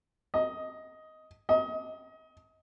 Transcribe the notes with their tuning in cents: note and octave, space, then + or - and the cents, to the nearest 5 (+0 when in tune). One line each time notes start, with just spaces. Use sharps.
D#5 +10
D#5 +30